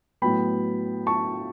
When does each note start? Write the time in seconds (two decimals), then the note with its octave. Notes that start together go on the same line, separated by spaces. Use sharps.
0.22 A2 F#3 B3 G5 B5
1.07 A5 C#6